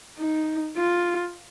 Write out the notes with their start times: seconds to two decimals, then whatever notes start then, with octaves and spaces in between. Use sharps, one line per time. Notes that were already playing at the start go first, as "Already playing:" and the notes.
0.18 D#4
0.77 F4